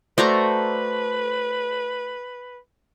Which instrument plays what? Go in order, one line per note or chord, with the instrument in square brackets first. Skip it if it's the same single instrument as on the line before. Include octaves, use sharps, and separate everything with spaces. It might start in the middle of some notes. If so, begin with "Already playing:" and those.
[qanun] A3 F#4 A#5 [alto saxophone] B4 [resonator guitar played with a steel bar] C5 D5